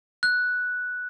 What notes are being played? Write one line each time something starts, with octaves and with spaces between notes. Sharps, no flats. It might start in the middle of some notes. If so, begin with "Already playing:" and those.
F#6